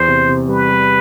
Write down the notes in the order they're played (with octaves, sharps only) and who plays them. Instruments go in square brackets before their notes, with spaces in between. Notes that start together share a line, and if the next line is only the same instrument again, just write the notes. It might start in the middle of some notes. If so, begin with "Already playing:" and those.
Already playing: [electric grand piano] E2 [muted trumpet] C5
[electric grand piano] C3
C3
[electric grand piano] G3 [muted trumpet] B4
[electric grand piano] G3